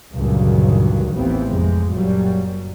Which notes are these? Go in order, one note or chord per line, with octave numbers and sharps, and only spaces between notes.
C#2 G2 A#2 D3 D#3 F#3
A1 D#2 E3 B3 C4
F2 C3 G#3
F#1 A#2 F#3 G3